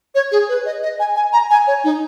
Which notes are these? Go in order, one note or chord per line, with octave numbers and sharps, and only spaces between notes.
C#5
G#4
B4
D#5
D#5
G#5
G#5
A#5
G#5
C#5
D#4